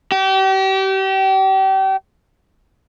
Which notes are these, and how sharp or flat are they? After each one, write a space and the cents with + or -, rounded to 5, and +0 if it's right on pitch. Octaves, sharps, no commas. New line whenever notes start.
G4 -35